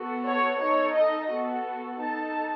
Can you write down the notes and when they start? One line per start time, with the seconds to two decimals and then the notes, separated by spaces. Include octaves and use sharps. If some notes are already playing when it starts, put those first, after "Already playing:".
Already playing: B3 F#4 A4
0.25 C#5
0.59 D#4 A4 C#5
0.95 D#5
1.29 B3 F#4 A4
1.99 D#4 A4 A5